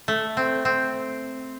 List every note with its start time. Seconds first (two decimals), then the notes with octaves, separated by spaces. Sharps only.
0.08 A3
0.37 C4
0.65 C4